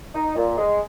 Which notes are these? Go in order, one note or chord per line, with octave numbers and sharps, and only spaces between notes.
D#4
A#2
G#3